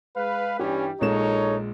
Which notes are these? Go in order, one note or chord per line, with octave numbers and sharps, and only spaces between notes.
G#3 B4 F5
G2 E3 G3 C#4 G4
A#1 G#3 D#4 A4 A#4 C#5 E7